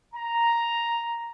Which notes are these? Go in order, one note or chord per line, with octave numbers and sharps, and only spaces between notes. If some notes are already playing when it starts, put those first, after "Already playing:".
A#5